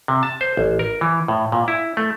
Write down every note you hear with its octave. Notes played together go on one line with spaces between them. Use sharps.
C3
A5
C5
A1
A#4
E3
A2
A#2
E4
A3